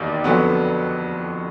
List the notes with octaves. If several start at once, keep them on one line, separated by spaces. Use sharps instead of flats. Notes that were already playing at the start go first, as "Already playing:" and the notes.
Already playing: E1 D#2 D#3 D5
F2 D3 F#3 B3